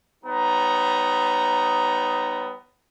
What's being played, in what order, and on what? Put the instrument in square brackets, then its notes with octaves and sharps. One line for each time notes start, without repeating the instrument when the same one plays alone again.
[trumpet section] G3 B3 D#4 C#5 A#5